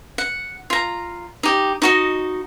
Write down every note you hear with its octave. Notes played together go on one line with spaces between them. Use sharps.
F#5
F4 A#5
D#4 G4
D#4 F#4 D#5